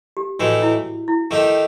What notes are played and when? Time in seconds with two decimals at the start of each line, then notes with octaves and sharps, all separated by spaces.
0.17 G4
0.39 A2 E3 A3 D#4 F#4
0.62 E4
1.08 E4
1.31 D#3 A3 D#4 G4